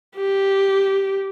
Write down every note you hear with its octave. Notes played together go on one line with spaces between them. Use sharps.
G4